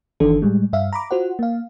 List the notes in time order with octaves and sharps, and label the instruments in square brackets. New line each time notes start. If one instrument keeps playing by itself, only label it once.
[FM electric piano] G1 D#3 E3 D4 A4
A2 G3 G#3
G2 E5 F5
A#5 B5 D6
F4 F#4 C5 F#5
A#3 F5